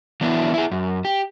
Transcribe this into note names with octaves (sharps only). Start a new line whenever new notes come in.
E3 F#3 B3 D4 E4
E4 G#4
F#2
G4